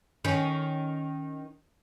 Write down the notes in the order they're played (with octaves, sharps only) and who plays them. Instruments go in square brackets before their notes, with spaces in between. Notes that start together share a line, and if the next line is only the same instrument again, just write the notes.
[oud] D#3 C#4